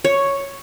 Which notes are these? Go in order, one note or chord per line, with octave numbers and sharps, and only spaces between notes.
C#5